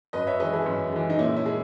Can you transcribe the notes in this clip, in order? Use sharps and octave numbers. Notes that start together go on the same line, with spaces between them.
F#2 B4 D#5
C#5 E5
E3 G#3 B4 D#5
E4 G#4
F#2
E3 G#3
D#4
A#2 C#4 E4
C#4 E4
G#3